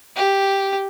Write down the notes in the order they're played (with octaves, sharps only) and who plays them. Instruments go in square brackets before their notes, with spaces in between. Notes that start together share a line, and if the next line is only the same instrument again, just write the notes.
[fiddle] G4